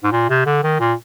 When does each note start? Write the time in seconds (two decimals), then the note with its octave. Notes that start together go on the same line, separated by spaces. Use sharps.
0.03 G#2
0.12 A#2
0.30 C3
0.46 D3
0.63 D#3
0.80 A#2